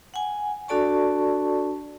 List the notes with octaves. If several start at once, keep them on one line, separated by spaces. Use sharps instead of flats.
F#5 G#5
D4 F#4 A4 D5 A5 C#6